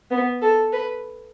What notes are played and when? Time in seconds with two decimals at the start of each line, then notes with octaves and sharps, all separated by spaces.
0.11 B3
0.42 A4
0.73 B4